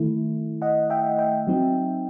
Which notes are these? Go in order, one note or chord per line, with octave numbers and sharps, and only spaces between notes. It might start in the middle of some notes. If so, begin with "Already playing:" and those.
Already playing: D#3 A3 E4
D#5 F#5
E5 G5
E5 G5
F#3 C4 D#4